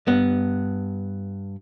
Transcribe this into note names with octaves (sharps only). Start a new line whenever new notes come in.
G2 B3